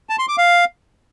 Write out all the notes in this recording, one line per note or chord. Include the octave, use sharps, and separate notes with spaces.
A5
C6
D6
F5